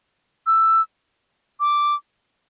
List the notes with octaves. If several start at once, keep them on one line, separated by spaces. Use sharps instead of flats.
E6
D6